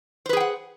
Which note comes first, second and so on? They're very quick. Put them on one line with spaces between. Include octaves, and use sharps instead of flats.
C5 B4 G#4 G5 F#5